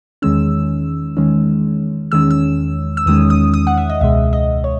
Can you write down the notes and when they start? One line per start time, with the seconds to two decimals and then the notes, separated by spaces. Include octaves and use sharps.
0.22 E2 D#3 G#3 C#4 E6
1.17 E2 D#3 G#3 C#4
2.12 E2 D#3 G#3 C#4 E6
2.31 E6
2.97 E6
3.06 E2 D#3 G#3 C#4 D#6
3.30 D#6
3.54 D#6
3.67 F#5
3.77 E5
3.90 D#5
4.01 C#2 B2 G#3 E5
4.33 D#5
4.64 C#5